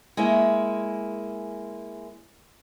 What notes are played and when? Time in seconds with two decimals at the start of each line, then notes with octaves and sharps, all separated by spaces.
0.17 G#3 A#3 C#4 E4